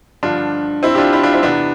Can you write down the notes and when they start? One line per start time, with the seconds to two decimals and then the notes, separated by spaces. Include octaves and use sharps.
0.23 G2 D3 F3 D4 F4
0.83 C4 E4
0.95 G4
0.98 D4 F4
1.13 E4 G4
1.23 D4 F4
1.33 C4 E4
1.43 E2 C3 E3 B3 D4